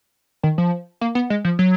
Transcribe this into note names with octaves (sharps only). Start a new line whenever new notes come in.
D#3
F3
A#3
B3
G#3
F3
F#3